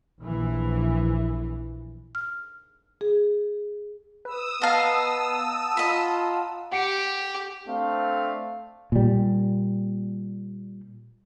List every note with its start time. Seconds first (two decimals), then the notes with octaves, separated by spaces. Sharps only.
0.21 A#1 E3
2.15 F6
3.01 G#4
4.25 B4 D#6 E6
4.62 B3 D#5 F5 F#5 A5 A#5
5.77 F4 D#5 B5
6.72 G4 F#5 C#7 D7
7.68 A3 C4 D4 F5
8.92 A#2 G3